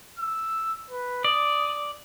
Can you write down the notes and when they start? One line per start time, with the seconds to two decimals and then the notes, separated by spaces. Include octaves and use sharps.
0.19 E6
0.91 B4
1.24 D5 D#6